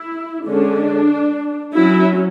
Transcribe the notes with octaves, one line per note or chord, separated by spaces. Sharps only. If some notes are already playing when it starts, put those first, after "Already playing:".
Already playing: E4
D3 G#3 C#4 D4
F#3 C#4 E4